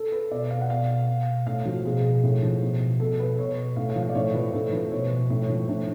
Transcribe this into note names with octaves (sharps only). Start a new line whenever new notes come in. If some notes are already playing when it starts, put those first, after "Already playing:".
Already playing: A4
B4
B2 D5
F5
F#5
B2 F5
B2
A2 F5
F3 F#4
B2 G#4
A2
F3
B2
B2 A4
B4
B2 C#5
A2 F5
F5
F3
F5
D5
A2 C#5
F3 B4
A2 A4
F3 B4
B2 C#5
A2
F3
A2 D4